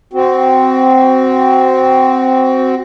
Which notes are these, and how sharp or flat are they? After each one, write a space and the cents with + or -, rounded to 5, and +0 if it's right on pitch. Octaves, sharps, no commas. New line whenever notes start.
C4 -5 F#4 +15